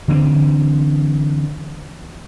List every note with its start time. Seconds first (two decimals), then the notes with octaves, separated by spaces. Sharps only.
0.08 D3 E3 G#3 C4